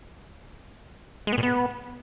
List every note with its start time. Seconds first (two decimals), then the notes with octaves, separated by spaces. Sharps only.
1.27 G#3
1.32 B3
1.38 A#2
1.43 B3